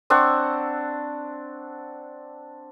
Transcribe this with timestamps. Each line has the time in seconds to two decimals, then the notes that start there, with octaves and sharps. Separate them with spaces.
0.10 C4 D4 F#5 C#6